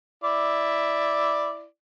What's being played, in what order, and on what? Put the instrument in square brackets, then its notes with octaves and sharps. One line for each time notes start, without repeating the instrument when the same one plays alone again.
[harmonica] E4 D5